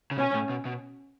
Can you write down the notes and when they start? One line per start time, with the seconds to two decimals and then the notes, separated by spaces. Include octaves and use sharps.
0.11 C#3
0.17 B2 C#4
0.34 A2
0.50 B2
0.65 B2